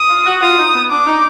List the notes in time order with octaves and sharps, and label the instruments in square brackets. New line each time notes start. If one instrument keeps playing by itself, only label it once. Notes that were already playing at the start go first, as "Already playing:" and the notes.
Already playing: [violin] D#6
[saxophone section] F4
F#4
[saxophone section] F4 [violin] D#6
[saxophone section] D#4
B3
[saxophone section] D4 [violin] D6
[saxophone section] D#4